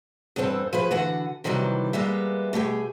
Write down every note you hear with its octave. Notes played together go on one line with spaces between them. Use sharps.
E2 G2 B3 C4 A4
F3 G#4 B4
D3 E3 F#4 F#5
C3 D#3 E3 F#3 G3
G3 G#3 A#3 B3 E5
B2 A3 G4 G#4